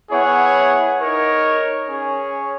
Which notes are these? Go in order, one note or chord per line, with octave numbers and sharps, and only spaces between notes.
B3 E4 G#4 C#5 F#5
D#4 A#4 C#5
C#4 G#4 C#5